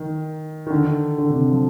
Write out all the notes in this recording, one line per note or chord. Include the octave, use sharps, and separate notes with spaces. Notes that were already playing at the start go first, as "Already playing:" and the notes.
Already playing: D#3
D#3
D3
D3
C3
F3